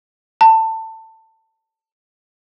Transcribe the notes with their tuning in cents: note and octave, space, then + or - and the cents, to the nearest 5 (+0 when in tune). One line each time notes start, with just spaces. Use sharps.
A5 +20